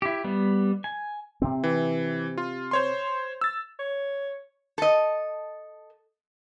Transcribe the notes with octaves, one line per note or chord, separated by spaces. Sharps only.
E4 G4
G3 B3
G#5
C3 C4
E3
F4
C5 C#5 C6
E6 A6
C#5
A4 D#5